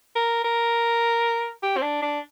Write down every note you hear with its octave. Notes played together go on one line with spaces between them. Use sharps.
A#4
A#4
G4
C4
D4
D4